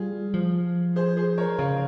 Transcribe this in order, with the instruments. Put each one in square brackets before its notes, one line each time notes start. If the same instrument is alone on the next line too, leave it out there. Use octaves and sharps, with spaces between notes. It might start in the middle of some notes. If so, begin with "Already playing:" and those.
Already playing: [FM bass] G3 [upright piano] F4 G#4
[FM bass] F3
[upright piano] G#4 C5
G#4 C5
A#4 C#5
[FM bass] C#3 [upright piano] C#5 F5